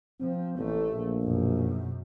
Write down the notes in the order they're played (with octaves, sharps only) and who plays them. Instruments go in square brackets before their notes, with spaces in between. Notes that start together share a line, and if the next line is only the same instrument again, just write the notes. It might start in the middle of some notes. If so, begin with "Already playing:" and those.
[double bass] F3 [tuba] C4
[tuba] A1 [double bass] A3
[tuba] A#1
[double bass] F#2 B2